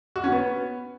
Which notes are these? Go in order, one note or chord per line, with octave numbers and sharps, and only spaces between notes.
F#4
C#4
B3